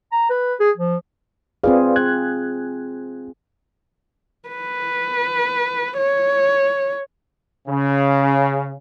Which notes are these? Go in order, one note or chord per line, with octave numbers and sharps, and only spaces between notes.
A#5
B4
G#4
F3
C4 F4 G#4 B4 D5 F5
F#6 G#6
B4
C#5
C#3